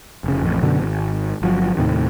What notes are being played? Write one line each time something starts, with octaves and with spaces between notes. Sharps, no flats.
F1 C#3
A1 F2
F#2 B2 D3 F#3
G#1
G1 F3 F#3
D#2 A2 C3 D#3